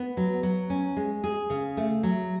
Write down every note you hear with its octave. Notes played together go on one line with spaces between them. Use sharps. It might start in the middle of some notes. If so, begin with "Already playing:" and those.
Already playing: B3
F#3
F#3
C#4
G#3
G#4
C#3
A3
F#3